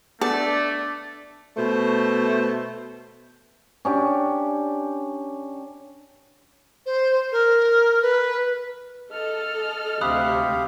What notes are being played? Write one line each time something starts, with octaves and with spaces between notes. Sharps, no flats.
A3 B3 D4 A4 D5
B2 A3 C5
C#4 D4 G4
C5
A#4
B4
A4 D#5 F6
D2 C3 G4 E5 F5 B5 D#6 F#6